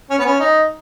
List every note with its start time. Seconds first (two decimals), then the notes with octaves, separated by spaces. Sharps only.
0.10 C#4
0.18 B3
0.26 C#4
0.40 D#4